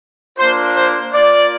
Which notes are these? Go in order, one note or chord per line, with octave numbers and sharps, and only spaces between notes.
A#3 D4 F4 C5
C5
A#3 F4 D5